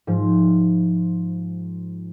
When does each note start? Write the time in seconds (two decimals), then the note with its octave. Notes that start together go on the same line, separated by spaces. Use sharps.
0.07 G#2 F3